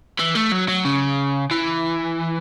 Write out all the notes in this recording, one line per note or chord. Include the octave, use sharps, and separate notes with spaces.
E3
A3
F#3
F#3
C#3
E3